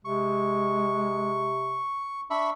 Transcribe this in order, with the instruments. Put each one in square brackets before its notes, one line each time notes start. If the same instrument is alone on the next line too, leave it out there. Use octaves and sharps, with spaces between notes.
[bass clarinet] C3 [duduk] G#3 [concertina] C#6
[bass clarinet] D4 [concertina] E5 B5 C#6